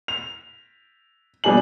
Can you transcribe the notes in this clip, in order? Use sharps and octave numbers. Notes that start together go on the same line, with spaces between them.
F7
B2 G3 D4 G#5 F#7